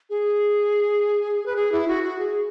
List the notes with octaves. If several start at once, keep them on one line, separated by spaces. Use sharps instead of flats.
G#4
B4
G#4
E4
F#4
F#4
G#4